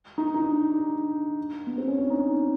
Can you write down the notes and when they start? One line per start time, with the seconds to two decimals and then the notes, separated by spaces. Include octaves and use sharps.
0.18 D#4
0.34 D#4
0.42 D4
1.67 B3
1.78 C4
1.88 C#4
1.99 D4
2.10 D#4